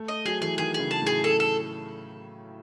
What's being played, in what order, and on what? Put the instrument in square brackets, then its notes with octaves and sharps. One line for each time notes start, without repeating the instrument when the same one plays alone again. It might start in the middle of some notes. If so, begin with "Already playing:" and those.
Already playing: [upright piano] A3
[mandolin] D#5
[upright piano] F#3 [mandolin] G#4
[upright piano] E3 [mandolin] G#4
[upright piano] D#3 [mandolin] G#4
[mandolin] G#4
[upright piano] C#3
[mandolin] A5
[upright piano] A2 [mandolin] G#4
[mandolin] A4
A4